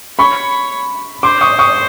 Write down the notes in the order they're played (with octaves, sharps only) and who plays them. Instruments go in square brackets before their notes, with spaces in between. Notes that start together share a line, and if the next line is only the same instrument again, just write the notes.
[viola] C#5 [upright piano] B5 C#6
[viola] C5 [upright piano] C6 D6
[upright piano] C#6 D#6
C#6 D#6